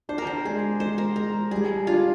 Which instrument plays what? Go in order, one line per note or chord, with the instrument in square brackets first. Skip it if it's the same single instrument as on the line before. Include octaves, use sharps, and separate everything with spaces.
[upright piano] D4 [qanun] C5
[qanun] A#4
C5
[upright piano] G#3 [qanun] G#4
[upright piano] G#3 [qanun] C5
[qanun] A#4
[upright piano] G#3 [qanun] A#4
[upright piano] G3 [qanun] G#4
[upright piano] D4 [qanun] F4